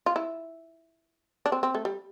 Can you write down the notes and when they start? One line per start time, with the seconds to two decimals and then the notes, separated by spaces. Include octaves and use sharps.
0.06 F4
0.16 E4
1.46 D4
1.52 C4
1.63 C4
1.75 A3
1.85 G3